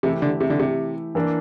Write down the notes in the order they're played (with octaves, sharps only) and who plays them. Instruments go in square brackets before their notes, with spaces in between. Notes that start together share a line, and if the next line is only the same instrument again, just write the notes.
[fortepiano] C3 [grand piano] E3 A3 E4 G4
[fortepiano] D3
C3
D3
C3
[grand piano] E3 A#3 D4